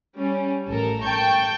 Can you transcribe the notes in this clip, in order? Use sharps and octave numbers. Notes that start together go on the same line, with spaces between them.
G3 C#4
A1 A4 A#4
G5 A5 C#6 G6